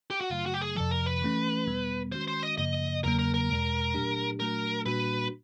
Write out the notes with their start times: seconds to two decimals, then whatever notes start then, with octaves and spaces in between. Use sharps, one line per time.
0.10 G4
0.21 F#4
0.30 F#2 C#3 F#3 A3 F4
0.46 F#4
0.54 G4
0.61 G#4
0.76 F2 C3 F3 A4
0.91 A#4
1.06 B4
1.22 E3 A3 C#4
1.67 E2 B2 G3 B3
2.12 D#3 G#3 C#4 F#4 C5
2.28 C5
2.43 D#5
2.58 F#2 C#3 F3 A#3 D#5
3.03 E2 C#3 F#3 A#3 A#4
3.19 A#4
3.34 A#4
3.50 E2 B2 G#3
3.94 A#2 F#3 A3 D4 G4
4.40 A#2 F#3 A3 D4 F#4 A#4
4.86 A#2 G3 A#3 D4 F#4 B4